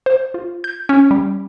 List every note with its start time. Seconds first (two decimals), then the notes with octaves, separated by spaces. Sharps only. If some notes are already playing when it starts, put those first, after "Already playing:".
0.06 C5
0.34 F4
0.64 G6
0.89 C#4
1.11 G3